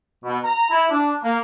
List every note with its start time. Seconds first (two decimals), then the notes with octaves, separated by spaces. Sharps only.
0.25 B2
0.43 A#5
0.70 E4
0.91 D4
1.23 A#3